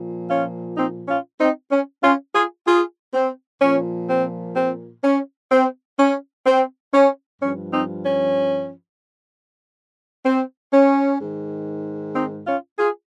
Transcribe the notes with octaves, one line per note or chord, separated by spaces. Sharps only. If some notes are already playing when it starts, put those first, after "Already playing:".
Already playing: A#2 F3
C#4 F4
C4 D#4
C#4 F4
C4 D#4
C#4
C#4 F4
F4 G#4
F4 G#4
C4
A#2 F3 C#4
C4
C4
C#4
C4
C#4
C4
C#4
G2 F3 C#4
C4 D#4
C#4
C4
C#4
G#2 D#3
C4 D#4
C#4 F4
F4 G#4